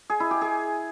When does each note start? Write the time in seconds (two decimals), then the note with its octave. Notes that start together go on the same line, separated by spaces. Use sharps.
0.10 G#4
0.20 E4
0.31 G4
0.41 G#4